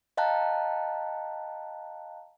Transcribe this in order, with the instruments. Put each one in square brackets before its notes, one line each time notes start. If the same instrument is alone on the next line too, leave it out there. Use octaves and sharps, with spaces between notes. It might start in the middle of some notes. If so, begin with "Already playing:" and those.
[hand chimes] D#5 F5 G5 A5 A#5 F#6